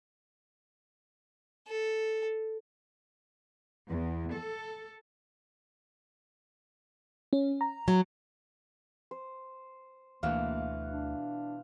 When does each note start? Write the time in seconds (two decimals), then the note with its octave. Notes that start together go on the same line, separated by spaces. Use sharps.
1.68 A4
3.88 E2
4.34 A4
7.33 C#4
7.61 A#5
7.88 F#3
9.11 C5
10.23 D2 B2 E3 A#3 F5 F#5
10.89 D4